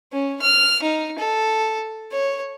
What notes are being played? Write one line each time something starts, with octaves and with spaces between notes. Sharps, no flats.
C#4
F6
D#4
A4
C#5